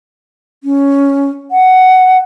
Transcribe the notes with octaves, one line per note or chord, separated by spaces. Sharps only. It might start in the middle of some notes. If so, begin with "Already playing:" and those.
C#4
F#5